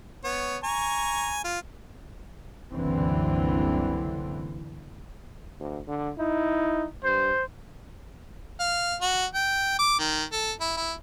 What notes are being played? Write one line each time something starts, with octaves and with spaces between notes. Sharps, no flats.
B3 C#5
G#5 A#5 C#6
F4
F#1 C2 D3 E3 C4
D2
D3
D#4 E4
G2 C5
F5
F#4
G5
D6
D#3
A4
E4
E4